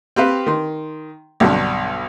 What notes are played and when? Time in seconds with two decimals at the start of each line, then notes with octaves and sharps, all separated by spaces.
0.16 C4 G4 B4 F5
0.46 D#3 C6
1.40 B1 G2 D3